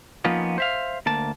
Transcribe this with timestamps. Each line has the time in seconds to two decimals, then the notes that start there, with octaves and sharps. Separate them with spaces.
0.25 F3 A#3 B3 C#4 D#4 F4
0.58 C5 E5 F5
1.06 D2 A#3 A5